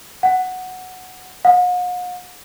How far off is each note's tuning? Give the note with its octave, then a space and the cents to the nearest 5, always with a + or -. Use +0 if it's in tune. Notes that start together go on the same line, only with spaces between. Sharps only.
F#5 +0
F#5 -45